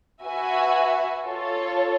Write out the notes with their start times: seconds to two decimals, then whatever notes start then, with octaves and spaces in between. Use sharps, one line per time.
0.24 F#4 B4 E5 G#5
1.24 F4 A4 C#5